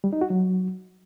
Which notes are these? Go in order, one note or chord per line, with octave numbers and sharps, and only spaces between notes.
G3
D#4
F#4
F#3